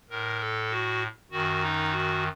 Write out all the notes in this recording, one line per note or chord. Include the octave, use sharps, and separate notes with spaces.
A2 A#4
A4
F#4
F#2 D#3 F#4
D#4
F#4